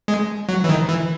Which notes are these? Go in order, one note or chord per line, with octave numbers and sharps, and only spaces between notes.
G#3
F#3
E3
D#3
E3